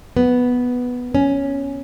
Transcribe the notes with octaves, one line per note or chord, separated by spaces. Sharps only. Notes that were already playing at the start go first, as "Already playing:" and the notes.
B3
C#4